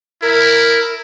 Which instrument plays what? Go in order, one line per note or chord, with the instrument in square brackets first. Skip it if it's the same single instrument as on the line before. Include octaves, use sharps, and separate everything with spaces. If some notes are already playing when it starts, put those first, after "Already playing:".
[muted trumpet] E4 [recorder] A#4